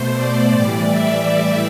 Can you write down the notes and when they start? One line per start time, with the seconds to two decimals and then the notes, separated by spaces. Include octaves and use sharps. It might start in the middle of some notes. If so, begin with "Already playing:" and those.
Already playing: B2 A3 C5
0.14 D5
0.50 A2 E3 G3
0.87 E5